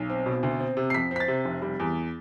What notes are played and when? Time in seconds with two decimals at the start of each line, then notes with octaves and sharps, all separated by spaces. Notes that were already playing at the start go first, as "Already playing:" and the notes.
Already playing: B1
0.09 C4
0.26 B2
0.43 D2
0.60 C4
0.77 C3
0.90 C7
0.94 F2 B6
1.11 C4 B6
1.20 A6
1.28 C3
1.45 F1
1.62 G3
1.80 E2